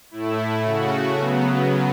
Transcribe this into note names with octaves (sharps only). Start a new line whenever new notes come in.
A2 A3 E4
C#3 A3 F#4
C#3 F#3 B3